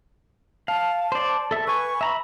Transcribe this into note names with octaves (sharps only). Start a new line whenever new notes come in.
F5 A5
C5 D5
A4 E5
B4 G#5 C#6
E5 A#5 B5